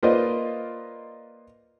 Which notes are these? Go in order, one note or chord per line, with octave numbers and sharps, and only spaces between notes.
A#3 F4 B4 C5 D5 D#5